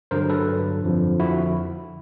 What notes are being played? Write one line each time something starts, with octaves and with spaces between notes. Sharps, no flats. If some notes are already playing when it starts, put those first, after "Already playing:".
G2 D3 F#3 A#4 C5
A4 B4
F2 D3 F3
E4 F#4